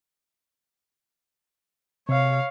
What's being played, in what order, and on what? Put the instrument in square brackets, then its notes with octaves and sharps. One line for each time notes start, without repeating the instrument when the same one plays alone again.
[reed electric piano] C3 [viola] C#5 F5